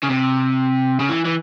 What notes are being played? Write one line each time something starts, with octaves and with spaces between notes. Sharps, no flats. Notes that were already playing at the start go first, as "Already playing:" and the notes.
C#3
C3
C#3
E3
E3